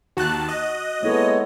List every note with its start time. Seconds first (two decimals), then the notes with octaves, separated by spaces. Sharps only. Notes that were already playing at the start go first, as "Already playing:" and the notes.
0.17 D#2 F#4 A5 F#6
0.48 D#5
1.03 G#3 A#3 B3 E4 A4 C#5